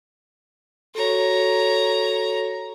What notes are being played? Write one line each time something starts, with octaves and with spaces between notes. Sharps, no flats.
F#4 A4 C#5 A#5